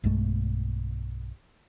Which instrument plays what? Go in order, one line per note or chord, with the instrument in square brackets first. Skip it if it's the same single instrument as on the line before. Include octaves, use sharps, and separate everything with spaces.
[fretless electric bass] B1 G2 G#3 A3